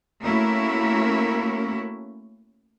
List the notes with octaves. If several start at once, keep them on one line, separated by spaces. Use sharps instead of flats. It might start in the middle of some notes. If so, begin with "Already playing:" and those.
A3 A#3 C#4 E4 F#4 A#4